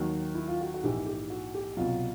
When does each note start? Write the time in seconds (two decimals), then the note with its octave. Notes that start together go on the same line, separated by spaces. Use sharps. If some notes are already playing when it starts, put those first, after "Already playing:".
Already playing: D#2 D#3 F#3
0.35 E4
0.48 F4
0.61 F#4
0.74 F#4
0.83 A#1 G#2 E3 G4
1.06 G4
1.30 F#4
1.55 G4
1.77 C2 B2 F#3 F4